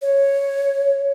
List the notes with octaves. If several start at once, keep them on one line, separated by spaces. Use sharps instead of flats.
C#5